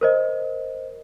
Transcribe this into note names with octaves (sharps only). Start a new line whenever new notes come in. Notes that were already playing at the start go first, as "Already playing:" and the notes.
A#4 C5 D#5